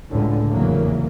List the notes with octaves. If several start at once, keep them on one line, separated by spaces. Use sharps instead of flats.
C#2 A2 D3
F1 E2 C#3 F#3 A#3